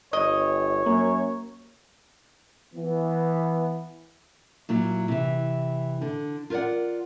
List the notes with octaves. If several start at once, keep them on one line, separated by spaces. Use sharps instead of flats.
G1 C#5 D#5
F#2 A#3
E3 B3
A#2 F#3 E4
C3 E3
D3
F4 A#4 C5 D5 F#5